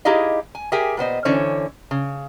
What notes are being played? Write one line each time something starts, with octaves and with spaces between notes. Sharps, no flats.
D#4 E4 G4 G#4 D#5 F5
G#5
G4 G#4 A#4 E5 G5 G#5
A#2 B3 C5 D#5
D3 E3 C#4 C5 C#5
C#3